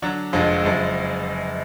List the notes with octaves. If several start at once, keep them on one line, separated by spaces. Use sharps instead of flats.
D3 F#3 D4
F1 F2 D3 F3 G#3
F#1 F#2 F3 G#3